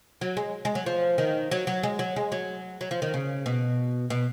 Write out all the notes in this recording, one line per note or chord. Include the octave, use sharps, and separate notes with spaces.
F#3
G#3
G#3
F#3
F3
D#3
F#3
F#3
G#3
F#3
G#3
F#3
F#3
F3
D#3
C#3
B2
B2